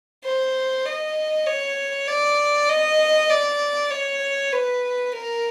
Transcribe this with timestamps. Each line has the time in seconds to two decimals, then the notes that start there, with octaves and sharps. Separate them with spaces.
0.25 C5
0.86 D#5
1.47 C#5
2.07 D5
2.69 D#5
3.30 D5
3.91 C#5
4.52 B4
5.13 A#4